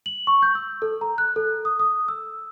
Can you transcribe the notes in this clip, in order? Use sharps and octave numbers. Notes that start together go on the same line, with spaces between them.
F#7
C#6
G6
E6
A4
A#5
F#6
A4
D#6
D#6
E6